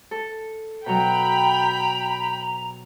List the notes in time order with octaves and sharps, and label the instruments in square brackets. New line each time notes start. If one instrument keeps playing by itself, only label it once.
[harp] A4
[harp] B2 F#3 [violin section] G5 B5 [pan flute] A#5